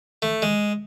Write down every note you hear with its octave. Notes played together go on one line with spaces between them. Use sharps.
A3
G#3